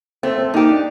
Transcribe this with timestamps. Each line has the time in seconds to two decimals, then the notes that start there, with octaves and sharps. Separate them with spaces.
0.23 A3 C4
0.38 C4
0.54 A#3 D#4 G4
0.69 D4